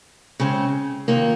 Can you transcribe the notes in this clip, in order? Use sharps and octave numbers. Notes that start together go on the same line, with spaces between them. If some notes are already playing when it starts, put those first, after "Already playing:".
C#3 G#3 C4
C3 D#3 A#3 F4